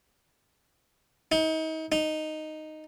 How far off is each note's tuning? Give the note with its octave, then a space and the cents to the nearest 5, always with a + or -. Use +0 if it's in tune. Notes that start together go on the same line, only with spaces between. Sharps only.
D#4 +35
D#4 -5